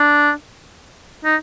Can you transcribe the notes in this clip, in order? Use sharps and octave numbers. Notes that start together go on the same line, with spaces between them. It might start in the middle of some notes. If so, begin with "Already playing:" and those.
Already playing: D4
D#4